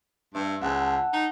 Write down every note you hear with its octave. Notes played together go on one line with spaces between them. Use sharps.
G2 E5
C#2 F#5 A5
D#4